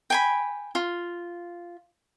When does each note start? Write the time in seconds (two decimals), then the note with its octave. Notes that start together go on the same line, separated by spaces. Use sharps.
0.10 G5 G#5 B5
0.75 F4